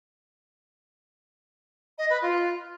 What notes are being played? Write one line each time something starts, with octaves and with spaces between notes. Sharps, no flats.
D#5
B4
F4